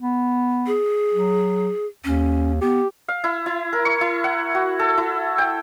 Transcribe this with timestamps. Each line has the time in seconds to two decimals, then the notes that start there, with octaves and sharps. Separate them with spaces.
0.01 B3
0.67 G#4
1.14 F#3
2.05 D#2 C#4
2.61 B3 G4
3.08 F5
3.24 E4
3.46 E4
3.73 A#4
3.85 C#6
4.01 E4
4.24 F#5
4.55 F#4
4.79 A4
4.97 E4
5.38 G5